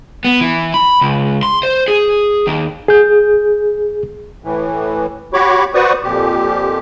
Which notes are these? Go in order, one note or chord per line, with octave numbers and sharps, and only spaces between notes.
B3
E3
B5
C#2
C6
C5
G#4
D#2
G#4 G6
A2 E3
F#4 G4 C#5 B5 C#6 D6
F#4 B4 C5 D5 C#6 D#6
F2 A#2 G4